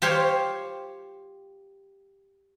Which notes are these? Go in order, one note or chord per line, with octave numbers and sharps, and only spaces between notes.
F4 G4 C5 C#5